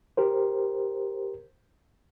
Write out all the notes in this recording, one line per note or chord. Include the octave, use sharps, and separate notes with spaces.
G4 A#4 C5